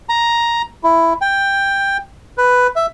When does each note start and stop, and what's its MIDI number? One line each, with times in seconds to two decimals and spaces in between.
0.09 0.62 82
0.84 1.13 64
1.21 1.97 79
2.38 2.67 71
2.76 2.86 76